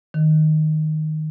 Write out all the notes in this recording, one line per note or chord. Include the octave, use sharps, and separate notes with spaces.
D#3